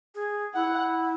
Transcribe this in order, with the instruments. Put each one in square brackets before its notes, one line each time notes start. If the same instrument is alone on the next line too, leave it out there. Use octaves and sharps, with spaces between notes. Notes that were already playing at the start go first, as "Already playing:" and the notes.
[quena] G#4
[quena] E4 [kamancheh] F#5